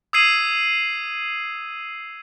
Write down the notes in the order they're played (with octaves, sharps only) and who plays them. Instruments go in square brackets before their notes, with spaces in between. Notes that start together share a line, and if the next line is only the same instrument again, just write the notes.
[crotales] D#6 E6 G#6 C7 D#7 F#7